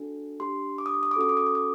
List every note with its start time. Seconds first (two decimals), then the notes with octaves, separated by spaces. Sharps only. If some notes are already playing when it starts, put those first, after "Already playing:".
Already playing: D4 F#4 A4
0.40 D4 G4 C6
0.78 D6
0.86 D#6
0.94 D6
1.03 D#6
1.11 D6
1.16 C#4 F#4 A4 D#6
1.29 D6
1.37 D#6
1.47 D6
1.55 D#6